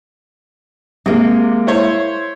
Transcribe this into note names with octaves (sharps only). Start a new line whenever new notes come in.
C3 G#3 A#3
E4 C5 C#5